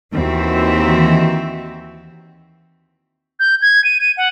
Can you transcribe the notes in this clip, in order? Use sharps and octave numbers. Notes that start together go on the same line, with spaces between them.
D#2 E3 C4 F#4 E5
G6
G#6
D#7
D#7
F#5